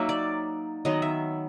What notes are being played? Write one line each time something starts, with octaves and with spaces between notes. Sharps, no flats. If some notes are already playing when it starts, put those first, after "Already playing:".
Already playing: F#3 A#3 D#4 E5
D5
D#3 F#3 B3 D#5
E5